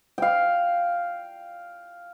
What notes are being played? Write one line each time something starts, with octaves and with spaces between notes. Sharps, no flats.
F5 G5